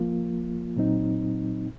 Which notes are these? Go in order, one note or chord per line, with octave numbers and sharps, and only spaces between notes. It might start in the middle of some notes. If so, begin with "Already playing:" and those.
Already playing: F3 A#3 F4
A#2 F#3 C4 D#4